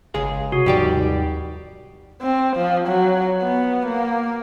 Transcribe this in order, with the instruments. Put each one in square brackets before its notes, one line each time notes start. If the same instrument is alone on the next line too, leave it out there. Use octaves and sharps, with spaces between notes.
[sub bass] G1 [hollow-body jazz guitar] C#2 G#4 F5
[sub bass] C3 [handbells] F#4 [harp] D#6
[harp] F1 G#2 A4 [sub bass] D#2 [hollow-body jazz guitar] G3 G4 D5
[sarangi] C4
F3
F#3
B3
A#3